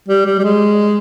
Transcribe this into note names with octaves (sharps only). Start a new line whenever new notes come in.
G3
G3
G3
G#3